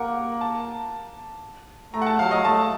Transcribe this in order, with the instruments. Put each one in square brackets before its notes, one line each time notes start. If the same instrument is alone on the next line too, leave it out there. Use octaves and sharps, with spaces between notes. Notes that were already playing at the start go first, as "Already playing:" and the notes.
Already playing: [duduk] A#3 [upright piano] A#4 F#5
[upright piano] A5
[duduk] A3 [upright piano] A#5
[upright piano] F#5
A5
[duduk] F#3 [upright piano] F5
[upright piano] D#5
[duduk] A3 [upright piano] A5